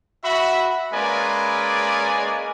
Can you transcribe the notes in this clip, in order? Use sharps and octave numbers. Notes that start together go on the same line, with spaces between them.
F#4 E5 B5
G#3 A#3 C#4 B4 D5 G#5